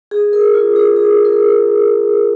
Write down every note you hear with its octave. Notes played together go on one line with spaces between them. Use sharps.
G#4
A#4
F4
G#4
G#4
A#4